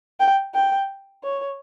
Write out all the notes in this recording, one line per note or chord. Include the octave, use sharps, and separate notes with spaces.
G5
G5
C#5